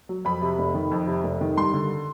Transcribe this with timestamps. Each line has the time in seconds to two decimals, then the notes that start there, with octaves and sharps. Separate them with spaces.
0.09 F#3
0.25 F2 B5
0.42 C3
0.58 F1
0.74 D#3
0.91 F2
1.07 C3
1.24 F1
1.41 D#3
1.57 G2 C6
1.74 D3